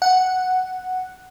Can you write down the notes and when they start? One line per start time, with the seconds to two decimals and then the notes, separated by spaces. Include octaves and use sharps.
0.02 F#5